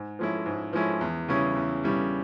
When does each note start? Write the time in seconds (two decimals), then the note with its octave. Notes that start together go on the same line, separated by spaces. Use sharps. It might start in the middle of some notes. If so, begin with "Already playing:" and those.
Already playing: G#2
0.19 F3 G#3 C#4 E4
0.46 G#2
0.73 F3 G#3 C#4 E4
1.01 E2
1.28 C#3 G3 C#4 E4
1.56 E2
1.83 C#3 G3 C#4 E4